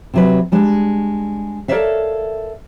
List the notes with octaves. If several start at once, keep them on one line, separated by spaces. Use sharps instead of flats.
C3 F#3 B4
G3 G#3 D4
A4 A#4 C#5 D5 E5 F5